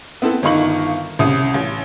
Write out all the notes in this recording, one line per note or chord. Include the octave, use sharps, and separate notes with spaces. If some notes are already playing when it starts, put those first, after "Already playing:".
B3 C4 E4 A4
G1 D#3 D#4 F5 C#6 F#7
C2 C#3 D#6
A1